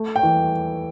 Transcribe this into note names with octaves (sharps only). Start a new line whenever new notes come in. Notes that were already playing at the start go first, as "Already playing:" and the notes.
Already playing: A3
G5
E3